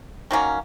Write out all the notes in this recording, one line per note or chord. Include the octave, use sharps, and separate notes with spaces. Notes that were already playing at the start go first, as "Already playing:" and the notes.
D#3 F#3 A#3 C#4